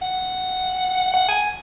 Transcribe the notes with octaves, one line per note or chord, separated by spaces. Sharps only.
F#5
F#5
G#5